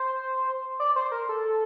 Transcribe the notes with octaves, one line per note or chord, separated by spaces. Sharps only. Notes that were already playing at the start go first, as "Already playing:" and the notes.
Already playing: C5
D5
C5
A#4
A4